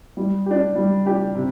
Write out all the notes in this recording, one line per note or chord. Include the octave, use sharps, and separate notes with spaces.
G3
D4 G4
G3
D4 G4
C3